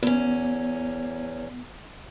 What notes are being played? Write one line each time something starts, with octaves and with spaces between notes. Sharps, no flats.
E2 B3 C#4